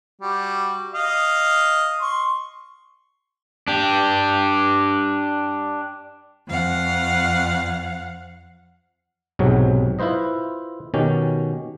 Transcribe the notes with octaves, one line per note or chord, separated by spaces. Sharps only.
G3 F#4
D#5 F5
C6 C#6
D4 G4
F2 F5 F#5
B1 G#2 C3 F#3 C#5
E4 F4 B4 C5 D#5
B2 D#3 C#4 G4